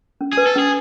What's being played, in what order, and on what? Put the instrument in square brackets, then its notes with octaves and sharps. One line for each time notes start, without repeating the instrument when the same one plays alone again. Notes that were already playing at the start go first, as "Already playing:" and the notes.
[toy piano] C#4
[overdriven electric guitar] G#4 [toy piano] B4
[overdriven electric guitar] A4
[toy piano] C#4 [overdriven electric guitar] G#4